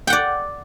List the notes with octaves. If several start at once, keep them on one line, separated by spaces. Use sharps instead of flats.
D5 F#5 G5